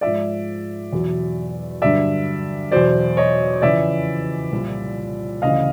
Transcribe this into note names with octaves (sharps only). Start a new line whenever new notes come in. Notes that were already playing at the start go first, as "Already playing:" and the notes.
G#2 F3 D5 E5
E2 B2 F#3
G2 D3 F#3 D5 E5
E2 B2 F#3 C5 D5
C#5 D#5
F2 C#3 E3 D5 E5
C2 A#2 F3
D2 C#3 E3 D#5 F5